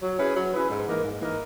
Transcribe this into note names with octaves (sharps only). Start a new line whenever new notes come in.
F#3
C#4 E4 G#4 B4
F#3
C#4 E4 G#4 B4
G#2
E3 A#3 D#4 A#4
G#2
E3 A#3 D#4 A#4